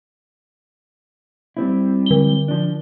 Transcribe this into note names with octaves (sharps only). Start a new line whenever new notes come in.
G3 C4 E4
D3 G7
F3 D4